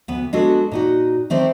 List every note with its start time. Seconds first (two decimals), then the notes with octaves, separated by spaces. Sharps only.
0.08 D2 B3
0.33 G#3 B3 D4 F#4 A4
0.71 A#2 D#4 F#4
1.30 D#3 A3 C4 C5 D5